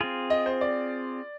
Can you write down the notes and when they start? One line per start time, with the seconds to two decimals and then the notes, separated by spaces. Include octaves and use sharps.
0.01 C4 F4 G#4
0.30 D#5
0.46 C5
0.61 D5